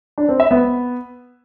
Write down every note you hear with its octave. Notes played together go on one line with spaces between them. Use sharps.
D4
C4
E5
B3